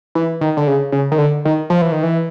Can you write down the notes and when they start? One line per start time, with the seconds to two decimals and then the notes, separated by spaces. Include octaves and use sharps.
0.15 E3
0.41 D#3
0.57 D3
0.67 C#3
0.92 C#3
1.11 D#3
1.18 D3
1.45 D#3
1.70 F3
1.82 E3
1.92 D#3
2.03 E3